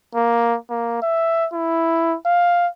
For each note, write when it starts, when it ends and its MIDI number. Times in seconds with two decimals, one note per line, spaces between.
0.15 0.57 58
0.70 1.01 58
1.02 1.47 76
1.53 2.16 64
2.26 2.68 77